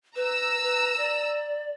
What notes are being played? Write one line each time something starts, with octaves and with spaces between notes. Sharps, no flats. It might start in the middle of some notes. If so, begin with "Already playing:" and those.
B4 A#5 E6
B4
D5